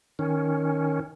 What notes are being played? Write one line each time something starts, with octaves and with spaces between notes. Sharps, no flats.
D#3 C#4